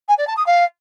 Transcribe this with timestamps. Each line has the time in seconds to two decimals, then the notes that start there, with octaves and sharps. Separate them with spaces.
0.08 G#5
0.18 D5
0.27 A5
0.37 D#6
0.46 F5